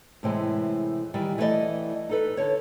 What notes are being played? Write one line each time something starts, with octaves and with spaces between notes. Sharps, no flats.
A2 C3 E3 G#3
D#3 E3 G3
E3 A3 E4 A4 D5 D#5
D#4 A4 B4
D3 C#5